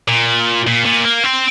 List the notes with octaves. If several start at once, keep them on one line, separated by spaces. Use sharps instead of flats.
A#2
A#2
A#2
A#3
C4